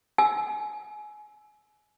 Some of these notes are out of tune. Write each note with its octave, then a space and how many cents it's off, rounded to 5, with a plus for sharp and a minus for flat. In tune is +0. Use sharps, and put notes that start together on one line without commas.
G#5 +25 E6 +5